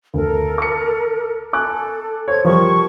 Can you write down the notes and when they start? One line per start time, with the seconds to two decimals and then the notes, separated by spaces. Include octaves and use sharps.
0.14 D2 A4 A#4
0.58 D6 C#7
1.53 A4 G#5 D6 F#6
2.28 A4 C5 C#5 G#6
2.45 F3 G3 A#4 C#6